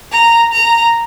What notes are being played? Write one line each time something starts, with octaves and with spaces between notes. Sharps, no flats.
A#5
A#5